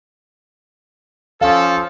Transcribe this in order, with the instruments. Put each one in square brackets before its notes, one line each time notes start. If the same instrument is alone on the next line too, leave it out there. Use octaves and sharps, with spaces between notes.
[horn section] F3 C#4 A4 [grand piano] F5